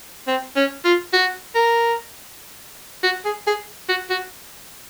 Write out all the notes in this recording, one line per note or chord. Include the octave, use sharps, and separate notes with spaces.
C4
C#4
F4
F#4
A#4
F#4
G#4
G#4
F#4
F#4